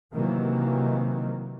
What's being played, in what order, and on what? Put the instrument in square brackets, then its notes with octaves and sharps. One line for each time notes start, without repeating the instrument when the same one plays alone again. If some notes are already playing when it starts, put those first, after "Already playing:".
[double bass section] C3 D#3 E3 F#3 A#3